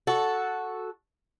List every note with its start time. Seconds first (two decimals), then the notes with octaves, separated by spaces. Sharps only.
0.07 F#4 A4